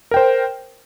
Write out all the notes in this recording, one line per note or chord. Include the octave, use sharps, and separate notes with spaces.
A#4 C5 G5